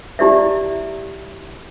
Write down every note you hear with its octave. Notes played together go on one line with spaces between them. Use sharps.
E4 G4 D5 E5